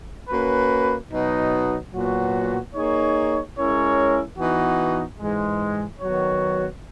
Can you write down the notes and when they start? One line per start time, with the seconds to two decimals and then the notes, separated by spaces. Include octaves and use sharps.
0.30 A#3 C#4 F#4 B4
1.11 B2 F#3 B3 D#4
1.92 A#2 F#3 B3 F#4
2.74 A#3 D#4 G#4 C#5
3.56 G#3 C#4 E4 A#4 C#5
4.37 E3 B3 D#4 F#4
5.19 G#2 E3 G#3
6.00 D#3 F#3 B3 F#4 C#5